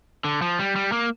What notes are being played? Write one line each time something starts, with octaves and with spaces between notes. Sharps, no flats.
D3
F3
G3
G3
A#3